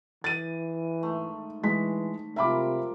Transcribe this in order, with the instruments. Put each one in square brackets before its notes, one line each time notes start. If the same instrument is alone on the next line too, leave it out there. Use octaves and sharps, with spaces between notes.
[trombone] E3 [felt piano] A6 D#7
[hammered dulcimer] G#2 A3
[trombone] E3 [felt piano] G#3 B6
[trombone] C3 [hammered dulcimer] F3 G3 A#4 [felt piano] E5 B5 D6